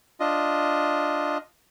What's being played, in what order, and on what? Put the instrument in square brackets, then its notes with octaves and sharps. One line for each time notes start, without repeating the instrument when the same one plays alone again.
[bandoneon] D4 F4 D#5